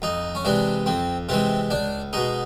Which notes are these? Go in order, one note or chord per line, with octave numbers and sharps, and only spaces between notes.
F2 D#4
C#4
C3 E3 G#3 D4
F2 C4
C3 E3 G#3 C4
C#2 D4
B2 G#3 D#4